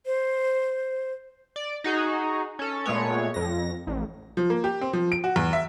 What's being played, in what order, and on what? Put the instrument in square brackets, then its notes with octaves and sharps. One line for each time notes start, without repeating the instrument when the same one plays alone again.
[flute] C5
[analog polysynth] D5
D#4 F#4 G#4
C#4 A4
A#2 G#3 A3 B3 C#5
F2 A#6
A1
[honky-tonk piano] F3
A#3
G4
C4
F3
D7
F#4
E2
E5